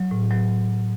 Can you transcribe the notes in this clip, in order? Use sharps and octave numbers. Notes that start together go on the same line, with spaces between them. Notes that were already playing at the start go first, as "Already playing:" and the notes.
Already playing: F#3
A2
F#3